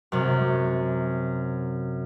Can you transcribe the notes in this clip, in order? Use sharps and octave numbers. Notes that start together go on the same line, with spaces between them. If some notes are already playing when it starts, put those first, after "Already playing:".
F#2 C3